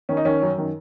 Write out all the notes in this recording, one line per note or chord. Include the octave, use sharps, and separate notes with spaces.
D#3 C#4
D#4
D#3 C#4
F#2
D#3